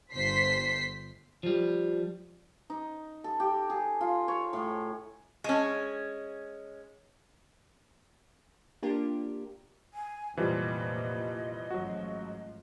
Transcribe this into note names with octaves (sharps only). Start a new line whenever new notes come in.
G1 C5 B6 C7
F3 G3
D#4
A4
G4
G#4
F4
C#5
A2
G#3 C#4
A#3 D4 F4 G4 A#4
G#5
F1 A#2 E3 F3 G3 D#5
A1 G#2 F3 F#3 F#4